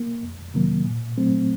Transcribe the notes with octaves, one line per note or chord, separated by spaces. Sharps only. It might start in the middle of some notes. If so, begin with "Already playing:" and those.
Already playing: A#3
F2
C3 D#3 F#3 A#3
A#2
F#3 A3 C4